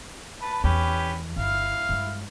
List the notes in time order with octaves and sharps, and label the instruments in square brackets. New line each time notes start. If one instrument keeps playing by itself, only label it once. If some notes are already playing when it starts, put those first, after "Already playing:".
[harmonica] B4 A5
[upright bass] E2 [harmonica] C#4 G4 B4
[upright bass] G1 [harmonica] E4 F5
[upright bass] G2 G#3